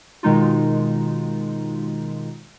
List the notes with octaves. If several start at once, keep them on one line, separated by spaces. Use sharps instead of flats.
B2 D#3 G#3 D#4 F4